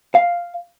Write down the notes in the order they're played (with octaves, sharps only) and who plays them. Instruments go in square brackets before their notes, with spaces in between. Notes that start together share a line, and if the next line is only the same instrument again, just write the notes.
[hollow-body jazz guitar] F5